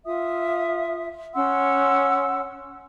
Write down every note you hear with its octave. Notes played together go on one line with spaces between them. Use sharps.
F4 E5 D#6
C#4 F#5 C6 E6